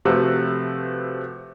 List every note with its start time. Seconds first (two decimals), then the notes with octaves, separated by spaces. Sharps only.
0.05 C3 F3 A3 F#4 B4 E6